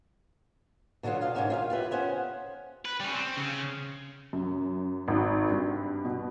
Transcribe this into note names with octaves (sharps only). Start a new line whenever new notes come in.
B2 D3 F#3 B3 F4
E2 F4 F5
G#2 D#3 G3 C#4 F#4 G4
F4 E5 F5
F4 G4 B4 E5
B3 C#4 C5 F#5
B4
G3 C#4
C4
C#3
F#2
G#1
G2
B2